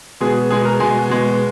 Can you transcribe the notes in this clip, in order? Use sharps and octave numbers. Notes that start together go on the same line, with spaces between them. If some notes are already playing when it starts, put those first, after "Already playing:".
B2 G#3 B3 G#4
B2 G#3 B3 G#4
A#4
B2 G#3 B3 G#5
B2 G#3 B3